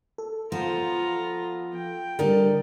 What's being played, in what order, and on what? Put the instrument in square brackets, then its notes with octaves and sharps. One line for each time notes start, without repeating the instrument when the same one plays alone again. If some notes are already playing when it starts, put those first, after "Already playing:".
[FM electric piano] A4
[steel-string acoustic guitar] F3 B3 C5 [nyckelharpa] F4 A#5
[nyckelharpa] G5
[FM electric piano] D3 G3 [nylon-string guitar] A4 A#4 [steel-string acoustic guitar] D5 D#5